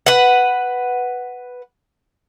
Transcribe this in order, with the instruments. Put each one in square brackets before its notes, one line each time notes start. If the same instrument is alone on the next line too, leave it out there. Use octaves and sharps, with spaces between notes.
[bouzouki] B4 F#5